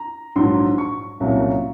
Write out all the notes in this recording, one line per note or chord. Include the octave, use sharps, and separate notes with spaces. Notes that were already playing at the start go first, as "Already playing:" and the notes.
Already playing: A#5
A#1 G#2 F#3 C6
C#6
C2 A#2 F#3 C#4